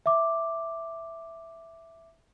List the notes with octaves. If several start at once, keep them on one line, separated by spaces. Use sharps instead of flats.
E5 D6